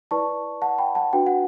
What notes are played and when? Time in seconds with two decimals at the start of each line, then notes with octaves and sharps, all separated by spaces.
0.11 E4 B4 D5 A5 C#6
0.62 F#5 A5
0.78 G5 B5
0.95 F#5 A5
1.13 D4 F#4 B4 G5
1.27 F#5